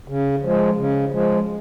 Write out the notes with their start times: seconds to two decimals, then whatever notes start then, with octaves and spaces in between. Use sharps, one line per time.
0.08 C#3
0.43 F3 G#3
0.77 C#3
1.12 F3 G#3